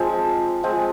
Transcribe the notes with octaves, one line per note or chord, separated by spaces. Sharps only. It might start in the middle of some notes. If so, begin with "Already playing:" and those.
Already playing: F3 G#3 C4
F3 G#3 C4